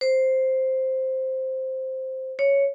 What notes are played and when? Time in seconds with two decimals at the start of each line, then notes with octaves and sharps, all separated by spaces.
0.01 C5
2.39 C#5